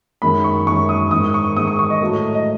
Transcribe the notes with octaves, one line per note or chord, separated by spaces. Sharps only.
F#2 D#3 G#3 B5
C#6
F#2 D#3 G#3 C#6
D#6
G#2 D#3 G#3 D#6
C#6
G#2 D#3 G#3 D#6
C#6
C#6
D#5
A2 F#3 A3
D#5